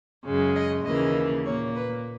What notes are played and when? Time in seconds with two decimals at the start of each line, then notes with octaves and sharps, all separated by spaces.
0.24 F#2 C#3 G#3
0.55 D#5
0.85 D#2 C#3 E3 A#3 D#5
1.45 A#2 A#3 C#5
1.75 B4